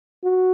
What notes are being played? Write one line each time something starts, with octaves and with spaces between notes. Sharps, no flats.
F#4